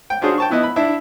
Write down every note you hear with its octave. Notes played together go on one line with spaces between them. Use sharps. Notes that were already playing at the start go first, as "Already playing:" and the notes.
G5
C#4 D4 F4 F#4 G#4 C5
G5 A5 C#6
F3 B3 E4 D#5
B5
D4 E4 E5